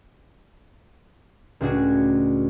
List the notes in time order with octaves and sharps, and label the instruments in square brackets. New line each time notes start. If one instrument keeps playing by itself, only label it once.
[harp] C#2 A2 D4 F#4 G#4